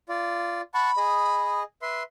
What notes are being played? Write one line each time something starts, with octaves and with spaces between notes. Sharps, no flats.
F4 D5
F#5 A5 B5 C#6
G#4 D#5
B4 E5 C6